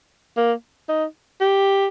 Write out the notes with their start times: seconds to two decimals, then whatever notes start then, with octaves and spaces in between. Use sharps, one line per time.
0.37 A#3
0.89 D#4
1.41 G4